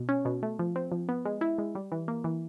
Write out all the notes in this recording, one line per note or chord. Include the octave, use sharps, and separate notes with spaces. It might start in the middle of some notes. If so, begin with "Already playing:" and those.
Already playing: B2
C#4
B2
A3
F3
C4
F3
B3
G#3
E4
G#3
G3
E3
A#3
E3